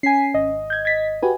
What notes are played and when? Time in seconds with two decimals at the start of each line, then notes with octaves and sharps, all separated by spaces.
0.03 C#4 G#5 B6 C7
0.34 G#1 D#5
0.70 G6 G#6
0.85 G#6 A6 B6
1.22 F#4 G4 B4 G#5